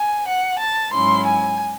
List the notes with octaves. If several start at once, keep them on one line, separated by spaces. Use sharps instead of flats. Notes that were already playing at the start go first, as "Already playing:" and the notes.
Already playing: G#5
F#5
A5
G#2 F#3 C#4 E4 C6
G#5